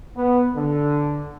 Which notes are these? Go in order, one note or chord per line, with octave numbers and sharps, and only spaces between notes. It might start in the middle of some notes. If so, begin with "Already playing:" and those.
B3
D3